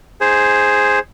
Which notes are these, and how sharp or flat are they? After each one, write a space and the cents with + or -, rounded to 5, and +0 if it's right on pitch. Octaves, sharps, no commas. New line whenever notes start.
D#4 +0 G#4 +0 C5 +5